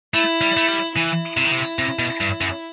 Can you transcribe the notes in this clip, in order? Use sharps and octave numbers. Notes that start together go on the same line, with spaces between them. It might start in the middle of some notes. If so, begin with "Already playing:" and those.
A3 E4
G3
A3
G3
E3 E4
C3
D#3
C3
C3
B2
G2
F#2